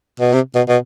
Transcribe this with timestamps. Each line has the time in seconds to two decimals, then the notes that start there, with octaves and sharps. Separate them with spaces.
0.20 B2
0.33 C3
0.55 B2
0.69 B2